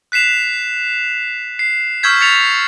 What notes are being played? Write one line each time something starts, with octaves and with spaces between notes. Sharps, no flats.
F#6 B6 C7 E7 F7
C7
C#6 E6 F6 G6 G#6 B6
A6 B6 C#7 F7